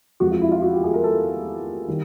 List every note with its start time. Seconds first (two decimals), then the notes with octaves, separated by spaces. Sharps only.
0.20 E2 C3 F3 G#3 F#4
0.31 F4
0.42 E4
0.52 F4
0.62 F#4
0.72 G4
0.84 G#4
0.94 A#4
1.04 A4
1.88 D#3 G3